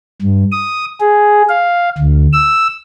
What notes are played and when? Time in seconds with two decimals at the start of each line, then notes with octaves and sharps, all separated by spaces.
0.22 G2
0.52 D#6
1.00 G#4
1.49 F5
1.98 D2
2.33 E6